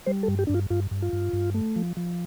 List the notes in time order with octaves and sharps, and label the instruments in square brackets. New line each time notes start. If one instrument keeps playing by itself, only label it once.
[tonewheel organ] G3 C5
A4
G2
G4
D4
G2 F4
G2 F4
G2
F4
G2
G2
A3
F3
F3